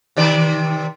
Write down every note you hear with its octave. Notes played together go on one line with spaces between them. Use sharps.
C3 D#3 D5